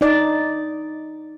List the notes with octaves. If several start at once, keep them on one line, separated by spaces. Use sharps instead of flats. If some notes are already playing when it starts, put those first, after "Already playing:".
D#4 D5